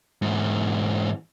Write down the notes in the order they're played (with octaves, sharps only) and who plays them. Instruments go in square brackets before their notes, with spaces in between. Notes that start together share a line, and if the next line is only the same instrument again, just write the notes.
[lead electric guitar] G#2 E3